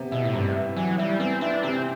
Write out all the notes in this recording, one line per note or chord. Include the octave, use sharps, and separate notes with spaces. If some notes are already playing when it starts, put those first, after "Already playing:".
Already playing: C3 B3
B2 E4
A2
G2 C3
E4
E3 F#3
G3 E4
B3 C4
D4 E4
C3 C4